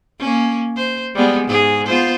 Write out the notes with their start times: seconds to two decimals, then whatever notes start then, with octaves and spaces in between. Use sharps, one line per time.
0.20 A#3 C#4
0.76 C5
1.15 G3 G#3 B3
1.48 G#2 G#4
1.87 B3 F4 C5